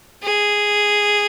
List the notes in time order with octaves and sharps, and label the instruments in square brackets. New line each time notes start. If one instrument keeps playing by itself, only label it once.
[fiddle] G#4